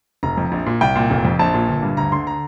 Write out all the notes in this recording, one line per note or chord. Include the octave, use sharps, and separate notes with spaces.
F1 A#5
F2
A#1
A#2
C2 G5
A#2
F1
F2
A#1 A5
A#2
G1
G2
D2 A#5
D3 C6
A#5